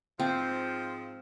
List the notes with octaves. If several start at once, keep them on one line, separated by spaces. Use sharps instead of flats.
G#2 F3 C4